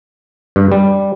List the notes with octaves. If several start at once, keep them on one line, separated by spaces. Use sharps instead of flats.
G2
G3